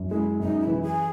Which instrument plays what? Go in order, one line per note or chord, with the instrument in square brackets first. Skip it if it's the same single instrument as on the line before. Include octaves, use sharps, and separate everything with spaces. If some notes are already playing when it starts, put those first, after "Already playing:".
Already playing: [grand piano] F#2
[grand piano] G#3 [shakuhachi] E4
[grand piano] F#2 [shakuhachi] D#4
[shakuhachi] E4
[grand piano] E3
[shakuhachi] G#4